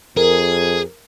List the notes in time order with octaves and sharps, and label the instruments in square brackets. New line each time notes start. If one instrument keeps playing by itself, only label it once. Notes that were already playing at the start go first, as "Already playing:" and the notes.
[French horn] F2 [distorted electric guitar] G#4 [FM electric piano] A#4